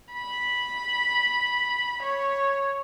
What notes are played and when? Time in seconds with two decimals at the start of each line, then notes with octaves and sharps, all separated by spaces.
0.12 B5
2.02 C#5